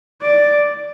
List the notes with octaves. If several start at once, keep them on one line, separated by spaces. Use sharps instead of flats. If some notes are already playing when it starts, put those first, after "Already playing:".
D5